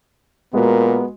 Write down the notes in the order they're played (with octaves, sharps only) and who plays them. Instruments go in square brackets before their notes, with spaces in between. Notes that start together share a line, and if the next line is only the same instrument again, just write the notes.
[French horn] A#2 [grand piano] G#3 F#4 [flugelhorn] B3 [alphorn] A#4